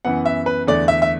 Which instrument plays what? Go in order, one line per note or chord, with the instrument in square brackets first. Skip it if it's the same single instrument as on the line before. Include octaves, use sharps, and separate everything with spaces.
[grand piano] F#2 E3 B3 F#5
E5
B4
E2 D3 A3 D5
E5
E5